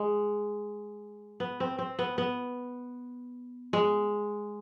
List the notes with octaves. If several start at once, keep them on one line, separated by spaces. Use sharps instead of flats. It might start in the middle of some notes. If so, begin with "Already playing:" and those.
Already playing: G#3
B3
C4
C4
B3
B3
G#3